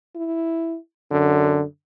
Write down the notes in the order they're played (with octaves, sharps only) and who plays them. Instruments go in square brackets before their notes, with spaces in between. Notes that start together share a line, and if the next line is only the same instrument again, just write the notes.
[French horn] E4
[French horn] F#2 [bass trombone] D3